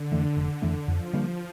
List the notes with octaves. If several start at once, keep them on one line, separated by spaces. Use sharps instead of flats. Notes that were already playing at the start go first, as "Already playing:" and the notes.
Already playing: D3
F2 E3 A3
F1 D3
F2 E3 A3
F2 F3
D3 G3 A#3